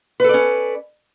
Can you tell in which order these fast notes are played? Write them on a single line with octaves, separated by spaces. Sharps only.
B4 A4 D5 C#4